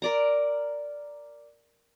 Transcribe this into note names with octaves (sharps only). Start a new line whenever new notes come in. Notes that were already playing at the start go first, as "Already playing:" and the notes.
A#4 D5 A#5